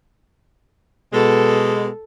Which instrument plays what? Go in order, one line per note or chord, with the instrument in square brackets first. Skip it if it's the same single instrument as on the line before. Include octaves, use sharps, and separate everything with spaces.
[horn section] B2 G#3 [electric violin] A4